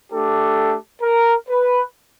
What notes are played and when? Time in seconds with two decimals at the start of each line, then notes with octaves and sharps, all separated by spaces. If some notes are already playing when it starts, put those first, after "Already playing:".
0.12 A3 D4 G4 A4
1.02 A#4
1.49 B4